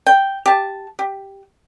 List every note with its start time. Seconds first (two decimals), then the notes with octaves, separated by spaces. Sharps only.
0.06 G5
0.46 G4 A5
0.99 G4